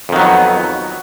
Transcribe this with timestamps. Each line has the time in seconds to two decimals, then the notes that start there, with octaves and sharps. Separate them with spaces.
0.09 F2
0.13 D#3
0.16 F#3
0.20 B3